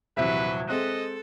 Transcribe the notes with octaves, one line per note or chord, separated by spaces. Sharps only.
D#1 C3 E3 F#3 B4 E5
G#3 C4 A4 D#5 F#6